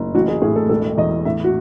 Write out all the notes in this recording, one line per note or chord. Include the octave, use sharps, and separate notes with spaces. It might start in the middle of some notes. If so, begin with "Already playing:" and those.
Already playing: F#1
A1 F#4
G#4
A2 G#4
A4
E1 A4
E2 D#5
A2 E5
F#4